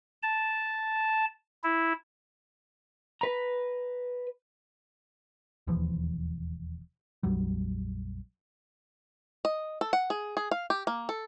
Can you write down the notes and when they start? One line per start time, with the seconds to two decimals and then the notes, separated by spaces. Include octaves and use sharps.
0.23 A5
1.63 E4
3.21 B4 A#5
5.67 E1 D#2 E3 F3
7.23 A#1 F2 F#3 G3
9.45 D#5
9.81 A4
9.93 F#5
10.10 G#4
10.37 G#4
10.51 F5
10.70 G4
10.87 A#3
11.09 A4